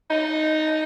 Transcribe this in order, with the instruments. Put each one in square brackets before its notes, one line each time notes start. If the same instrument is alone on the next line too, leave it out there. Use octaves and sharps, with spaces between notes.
[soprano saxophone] D#4